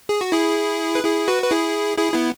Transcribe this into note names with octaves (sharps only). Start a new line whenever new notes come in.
G#4
F#4
E4 G#4
B4
E4 G#4
F#4 B4
B4
E4 G#4
E4 G#4
B3 E4